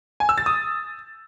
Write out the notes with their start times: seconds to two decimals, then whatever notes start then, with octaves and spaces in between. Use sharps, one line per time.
0.20 G#5
0.29 E6
0.38 A6
0.46 D#6